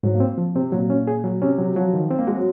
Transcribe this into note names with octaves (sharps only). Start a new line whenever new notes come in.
G#2 F#3
A#3
C4
F3
C3 C4
A#2 F#3
C#4
G#4
F#3
C3 C#4
F#3
F3 F#3
D#3
C4
A#3
G#3 F#4
F#3